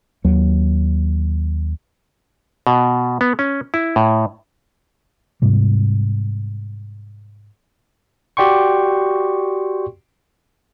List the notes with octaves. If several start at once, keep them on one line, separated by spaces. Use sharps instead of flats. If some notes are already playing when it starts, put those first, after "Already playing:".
D#2 F#3
B2
B3
C#4
E4
A2
G#2 C3 G3
F#4 G4 D5 G5 C6 C#6